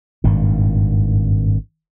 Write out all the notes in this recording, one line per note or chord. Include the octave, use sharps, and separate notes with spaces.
G#1 G2 A#2